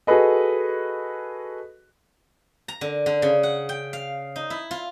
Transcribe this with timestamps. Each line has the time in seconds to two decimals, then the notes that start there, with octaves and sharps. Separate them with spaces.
0.07 F#4 G#4 A4 B4 D#5
2.68 A#5
2.81 D3
3.06 D3
3.22 C#3
3.43 F#5
3.69 G5
3.93 F5
4.36 D#4
4.50 E4
4.71 F4